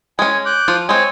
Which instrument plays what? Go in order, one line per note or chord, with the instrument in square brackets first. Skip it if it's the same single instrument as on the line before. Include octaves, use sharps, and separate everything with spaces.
[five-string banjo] G#3 C#4 [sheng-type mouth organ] G#5
[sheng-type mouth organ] D6 F#6 G6
[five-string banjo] F3 F4
[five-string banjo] G#3 C4 [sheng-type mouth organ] C#5 G#5